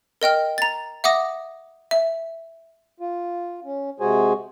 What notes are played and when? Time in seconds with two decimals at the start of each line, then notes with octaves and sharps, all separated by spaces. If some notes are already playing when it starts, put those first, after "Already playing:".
0.21 A#4 D#5 G5 F6
0.58 A#5 A6
1.04 E5 F#5 D6 D#6 A#6
1.91 E5
3.00 F4
3.64 C#4
4.00 C3 G#3 F#4 G#4 C5 G#5